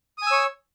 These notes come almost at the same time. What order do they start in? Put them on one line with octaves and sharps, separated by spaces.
D#6 G#5 E6 C#5